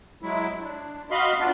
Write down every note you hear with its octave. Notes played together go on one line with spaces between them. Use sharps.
F#3 G#3 E4
D4
F#4 D#5 F5 B5 C6
B3 D4 F4